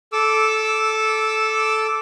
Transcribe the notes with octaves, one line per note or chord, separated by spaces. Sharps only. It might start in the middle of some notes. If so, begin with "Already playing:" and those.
A4 D6 E6